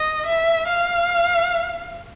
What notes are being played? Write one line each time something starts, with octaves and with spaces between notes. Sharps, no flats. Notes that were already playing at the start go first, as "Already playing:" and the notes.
Already playing: D#5
E5
F5